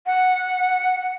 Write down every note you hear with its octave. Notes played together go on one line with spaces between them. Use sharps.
F#5